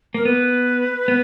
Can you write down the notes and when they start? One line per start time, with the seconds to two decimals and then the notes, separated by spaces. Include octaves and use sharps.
0.14 A#3 A#4
0.25 B3 B4
1.08 B3